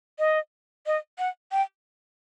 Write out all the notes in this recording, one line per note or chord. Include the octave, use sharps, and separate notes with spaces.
D#5
D#5
F#5
G5